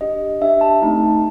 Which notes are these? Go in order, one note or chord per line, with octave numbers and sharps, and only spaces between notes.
D4 G4 D#5
D4 G4 E5
A5
A3 C4 D#4